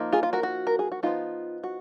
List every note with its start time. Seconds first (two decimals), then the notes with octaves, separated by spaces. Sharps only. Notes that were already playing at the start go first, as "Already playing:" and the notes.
Already playing: F3 A#3 D#4
0.13 F4 G#4
0.23 F4
0.33 F#4 A#4
0.43 F#4
0.67 A#4
0.79 G#4
0.92 F#4
1.03 F3 B3 D#4 F4
1.64 F#4